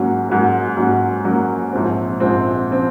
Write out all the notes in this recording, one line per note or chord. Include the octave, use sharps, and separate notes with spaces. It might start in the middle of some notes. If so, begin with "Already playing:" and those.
Already playing: G#2 F#3 A#3 C#4 F#4
G#2 F#3 A#3 C#4 F#4
G#2 F#3 A#3 C#4 F#4
G#2 F#3 A#3 C#4 F#4
A#1 G#2 F3 C4
A#1 G#2 F3 C4
F3 C4